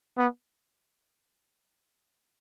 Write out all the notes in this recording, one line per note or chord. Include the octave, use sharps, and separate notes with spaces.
B3